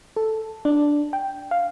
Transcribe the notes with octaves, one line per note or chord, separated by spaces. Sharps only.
A4
D4
G5
F5